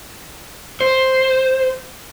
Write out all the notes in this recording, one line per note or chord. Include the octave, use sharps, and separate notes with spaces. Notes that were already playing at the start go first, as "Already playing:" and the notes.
C5